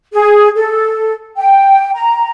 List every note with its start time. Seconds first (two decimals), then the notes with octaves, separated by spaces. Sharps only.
0.12 G#4
0.55 A4
1.36 G5
1.94 A#5